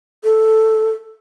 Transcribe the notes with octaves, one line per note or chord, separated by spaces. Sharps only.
A4